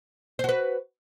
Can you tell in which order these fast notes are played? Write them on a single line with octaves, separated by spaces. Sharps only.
C5 F#4 B4